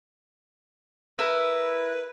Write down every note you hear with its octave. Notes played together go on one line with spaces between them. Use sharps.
E4 A#4 B4